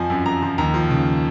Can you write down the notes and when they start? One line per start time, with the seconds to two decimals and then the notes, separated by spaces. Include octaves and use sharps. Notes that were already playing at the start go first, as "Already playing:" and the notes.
Already playing: F2 F3 G#5
0.10 F#2
0.26 F#2 A#5
0.42 F3
0.58 D#2 A#5
0.74 F3
0.90 C#3